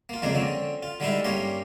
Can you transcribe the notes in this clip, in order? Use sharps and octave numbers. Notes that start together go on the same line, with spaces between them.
A#3 F4
F2 C#3 G#3 A#3 D4 A#5
D3 C4 C#4
F4
D3 G3 G#3 D#4 E4 A#4
G2 A#3 C#4 G4 C#5 C6